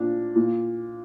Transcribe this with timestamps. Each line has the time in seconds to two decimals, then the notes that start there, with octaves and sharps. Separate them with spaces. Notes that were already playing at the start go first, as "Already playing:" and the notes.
Already playing: A#2 D4
0.35 A#2